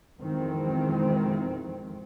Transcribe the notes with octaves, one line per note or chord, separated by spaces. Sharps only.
F2 B2 D#3 E3 G#3 C4